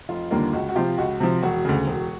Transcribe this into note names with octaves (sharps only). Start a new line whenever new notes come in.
F1 F4
D#2 D3 G3 A#3 F4
C#2 F#4
F#4
C3 F3 F4 G4
C#2 F#4
C3 F3
E1 F#4
D2 C#3
E1